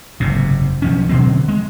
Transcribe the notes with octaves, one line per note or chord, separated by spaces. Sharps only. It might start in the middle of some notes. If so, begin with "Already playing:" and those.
F#1 G#2 C3
B1 F3 C#4
B2 D3 F#3 C4
G#3